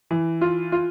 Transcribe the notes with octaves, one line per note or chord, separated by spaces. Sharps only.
E3
F4
F4